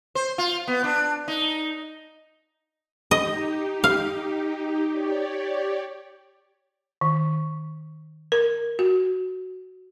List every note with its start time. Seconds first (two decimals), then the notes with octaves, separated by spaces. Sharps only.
0.15 C5
0.38 F4
0.68 B3
0.84 D4
1.28 D#4
3.11 D#4 G4 D#5
3.84 F5
4.91 G4 C#5 D5
7.01 D#3
8.32 A#4
8.79 F#4